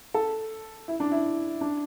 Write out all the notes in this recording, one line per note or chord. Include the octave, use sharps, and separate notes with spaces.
A4
E4
D4
E4
D4